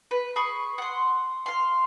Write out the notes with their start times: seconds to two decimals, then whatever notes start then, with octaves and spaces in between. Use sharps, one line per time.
0.11 B4
0.36 G#4 B5 C#6
0.78 F#5 C6
1.46 F5 C6